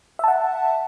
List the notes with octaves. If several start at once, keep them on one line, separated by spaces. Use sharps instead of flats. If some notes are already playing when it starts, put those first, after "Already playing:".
E5 F#5 A5